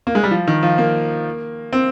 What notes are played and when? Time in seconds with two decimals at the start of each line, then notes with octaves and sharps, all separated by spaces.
0.07 A#3
0.15 G#3
0.23 G3
0.31 F3
0.48 D#3
0.63 F3
0.78 A#3
1.73 C4